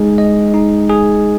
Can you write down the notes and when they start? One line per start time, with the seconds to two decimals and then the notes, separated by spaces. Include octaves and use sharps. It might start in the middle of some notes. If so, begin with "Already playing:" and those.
Already playing: G#3 D#4 G#4
0.18 D#5
0.54 D#4
0.89 G#4